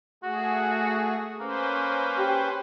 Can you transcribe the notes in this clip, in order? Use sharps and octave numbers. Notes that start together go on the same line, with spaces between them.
A3 F#4 G#4
A#3 C#4 B4 C5
G4